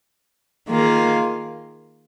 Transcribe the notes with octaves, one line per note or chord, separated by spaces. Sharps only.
D#3 A#3 F4 G#4